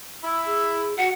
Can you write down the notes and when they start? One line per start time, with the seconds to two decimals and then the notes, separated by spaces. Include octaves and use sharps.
0.24 E4 E5 B5
0.46 G#4
0.98 F#4 F#5